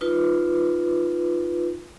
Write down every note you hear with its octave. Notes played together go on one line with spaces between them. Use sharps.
D#4 F4 B4